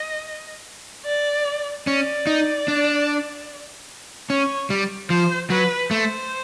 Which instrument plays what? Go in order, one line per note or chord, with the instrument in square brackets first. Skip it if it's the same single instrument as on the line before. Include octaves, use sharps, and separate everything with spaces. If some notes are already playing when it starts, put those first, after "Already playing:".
Already playing: [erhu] D#5
D5
[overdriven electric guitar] C#4 [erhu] D5
[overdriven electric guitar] D#4
D4
[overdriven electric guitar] C#4 [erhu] C#5
[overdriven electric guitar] G3
[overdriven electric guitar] F3 [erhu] C5
[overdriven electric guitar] F#3 [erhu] B4
[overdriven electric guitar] A3 [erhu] C5